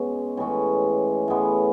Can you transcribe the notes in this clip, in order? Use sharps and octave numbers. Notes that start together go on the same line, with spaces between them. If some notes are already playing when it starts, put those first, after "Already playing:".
Already playing: B2 G#3 C#4
A2 E3 G#3 C#4
A2 G#3 B3